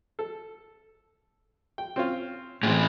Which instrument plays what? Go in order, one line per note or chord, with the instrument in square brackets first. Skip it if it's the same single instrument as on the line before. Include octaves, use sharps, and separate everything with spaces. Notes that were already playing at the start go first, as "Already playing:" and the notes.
[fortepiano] A4
G5
C4 C#4 F4
[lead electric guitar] A2 E3 [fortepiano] C4 G#4